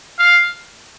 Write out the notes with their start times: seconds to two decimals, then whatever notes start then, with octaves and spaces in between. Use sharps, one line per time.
0.19 F5